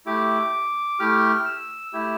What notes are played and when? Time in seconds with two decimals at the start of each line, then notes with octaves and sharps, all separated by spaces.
0.06 A3 E4 G4 D6
1.00 A3 E4 G4 F6
1.45 E6
1.93 A3 E4 G4